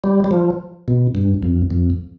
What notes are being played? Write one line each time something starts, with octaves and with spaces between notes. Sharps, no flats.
G3
G3
F3
B2
G2
F2
F2